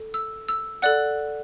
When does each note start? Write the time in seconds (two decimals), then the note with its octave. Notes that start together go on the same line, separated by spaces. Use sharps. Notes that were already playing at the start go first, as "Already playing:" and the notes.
Already playing: A4
0.14 E6
0.49 E6
0.82 A4 D5 F#5 F#6